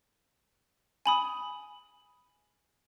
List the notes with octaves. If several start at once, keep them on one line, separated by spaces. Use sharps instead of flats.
G#5 B5 D#6